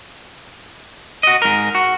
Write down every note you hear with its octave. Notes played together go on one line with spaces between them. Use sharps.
F#4 D#5
G#2 A#4
F#4